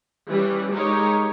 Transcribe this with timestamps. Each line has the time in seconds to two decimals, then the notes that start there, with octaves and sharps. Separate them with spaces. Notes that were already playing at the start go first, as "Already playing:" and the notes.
0.29 E3 G3 C#4
0.73 G#3 D#4 G4 A#4 C#5